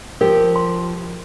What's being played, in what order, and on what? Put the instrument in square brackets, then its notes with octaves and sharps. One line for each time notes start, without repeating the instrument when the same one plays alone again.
[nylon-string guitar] F3 G4 [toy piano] A#4
[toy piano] C6